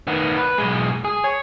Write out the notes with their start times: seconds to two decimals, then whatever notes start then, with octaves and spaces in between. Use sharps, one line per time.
0.07 D#3 B3
0.38 B4
0.58 B1 G#3
1.05 G#4
1.24 C#5